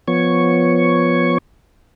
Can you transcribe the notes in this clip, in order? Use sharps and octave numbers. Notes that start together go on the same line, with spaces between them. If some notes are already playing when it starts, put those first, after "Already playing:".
F3 B3 C#5 C#6